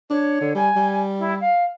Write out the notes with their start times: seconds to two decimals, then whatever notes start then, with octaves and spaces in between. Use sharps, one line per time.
0.10 D4 C#5
0.41 D3
0.55 G3 G#5
0.76 G3
1.19 E4
1.40 F5